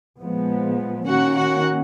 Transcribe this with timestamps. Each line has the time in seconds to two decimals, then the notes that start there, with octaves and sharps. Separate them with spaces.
0.20 A#2 F3 G#3 B3
1.07 D#3 A#3 C#4 F#4 F#5
1.36 F#4 F#5